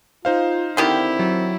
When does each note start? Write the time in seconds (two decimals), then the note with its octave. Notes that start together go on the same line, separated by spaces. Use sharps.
0.25 D#4 F4 C5 F5
0.77 D3 D#3 C4 E4 G4
1.19 F#3